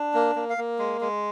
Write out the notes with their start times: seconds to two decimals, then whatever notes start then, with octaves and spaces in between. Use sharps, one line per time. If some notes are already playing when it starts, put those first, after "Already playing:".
Already playing: D4
0.14 A#3
0.35 A#3
0.50 F5
0.57 A#3
0.79 G#3
1.01 G#3